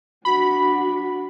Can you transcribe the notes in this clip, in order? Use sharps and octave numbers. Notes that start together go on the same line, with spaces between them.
D4 F#4 B5